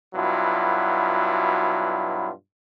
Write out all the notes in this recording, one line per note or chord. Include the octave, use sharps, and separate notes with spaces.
G2 B2 F#3 E4 F4